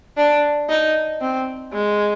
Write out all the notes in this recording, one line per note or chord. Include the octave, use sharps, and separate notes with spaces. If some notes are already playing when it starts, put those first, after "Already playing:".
D4
D#4
C4
G#3